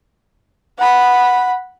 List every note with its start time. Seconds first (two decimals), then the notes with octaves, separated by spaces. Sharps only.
0.78 F#5 B5